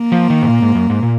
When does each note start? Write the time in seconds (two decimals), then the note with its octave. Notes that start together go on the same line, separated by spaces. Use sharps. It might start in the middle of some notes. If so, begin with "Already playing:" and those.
Already playing: A#3
0.12 F3
0.30 D#3
0.42 G#2
0.48 A#2
0.62 G#2
0.75 F#2
0.90 G#2
1.03 A#2